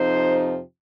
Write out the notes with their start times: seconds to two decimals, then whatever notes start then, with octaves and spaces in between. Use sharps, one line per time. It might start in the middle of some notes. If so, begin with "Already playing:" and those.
Already playing: F2 C3 F3 C4 D#4 C5